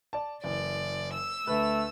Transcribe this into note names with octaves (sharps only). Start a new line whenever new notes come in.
D5 A5
F#1 E3 D5
E6
D2 A3 B4